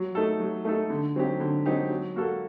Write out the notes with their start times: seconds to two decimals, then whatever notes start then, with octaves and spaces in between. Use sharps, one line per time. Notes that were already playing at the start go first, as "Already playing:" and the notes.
Already playing: F#3
0.15 A3 D#4 A4
0.40 F#3
0.65 A3 D#4 A4
0.90 D3
1.16 F#3 C4 D#4 G4
1.40 D3
1.66 F#3 C4 D#4 G4
1.90 F#3
2.16 A#3 F#4 A4